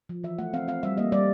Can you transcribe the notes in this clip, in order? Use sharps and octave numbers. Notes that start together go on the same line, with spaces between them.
F3
E3 E5
A3 F#5
C4 F5
C4 F5
G3 E5
A#3 D#5
G3 D5